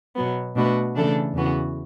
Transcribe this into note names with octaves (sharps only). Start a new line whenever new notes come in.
B2 F#3 B3
B2 A3 D4 F#4 B4
C#3 E3 A3 D4 A4
E2 C#3 E3 B3 F#4